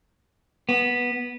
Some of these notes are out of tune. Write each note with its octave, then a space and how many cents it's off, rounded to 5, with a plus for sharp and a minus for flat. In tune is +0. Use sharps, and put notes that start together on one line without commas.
B3 -10